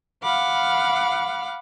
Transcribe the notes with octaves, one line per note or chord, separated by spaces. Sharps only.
F5 F#5 B5 D6 F6